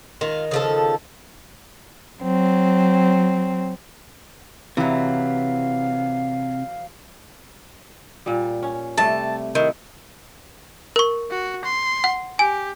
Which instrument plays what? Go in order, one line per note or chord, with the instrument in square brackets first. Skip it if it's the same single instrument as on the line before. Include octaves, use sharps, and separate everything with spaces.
[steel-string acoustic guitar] D#3 G#3 [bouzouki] F4
[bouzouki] C#3 F3 A4
[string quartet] F#3 C4
[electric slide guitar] C3 [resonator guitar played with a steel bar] E3 F#3 [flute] F5
[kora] A#2 G3
C#4
[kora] C3 G3 A3 [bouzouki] A5
[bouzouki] D#3 [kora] E4
[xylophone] A#4 C#6
[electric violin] F#4
C6
[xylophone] F#5
[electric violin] G4 [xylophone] G#5